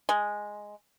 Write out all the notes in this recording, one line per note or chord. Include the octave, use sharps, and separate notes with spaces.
G#3